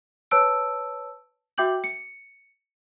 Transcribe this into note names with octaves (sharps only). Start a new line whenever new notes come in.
B4 C#5 A5 E6 D7
F#4 E5 G5 D6 G6 F#7
C#7